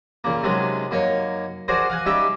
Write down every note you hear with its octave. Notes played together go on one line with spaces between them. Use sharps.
A#2 C#3 A#3
C3 D#3 F#3 G#3 C#4
F#2 A#3 D#4 C#5
D4 F#4 G#4 A#4 C5
F5 F#5 G#5
G3 C#4 D#4 G4 E5 F5